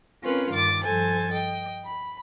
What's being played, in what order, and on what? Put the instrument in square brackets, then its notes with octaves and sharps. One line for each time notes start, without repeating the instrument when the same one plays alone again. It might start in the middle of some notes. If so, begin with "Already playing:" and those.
[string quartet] C4 C#4 F4 A#4 B4 C#5
G2 D#3 D6 A6
G2 F3 A4 C5 G#5 A6
D#5 G5
B5